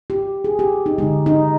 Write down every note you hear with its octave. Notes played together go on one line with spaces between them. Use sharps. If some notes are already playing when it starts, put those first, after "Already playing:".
G4
G#4
G4
D#4
D3 G#3 D#4
D#4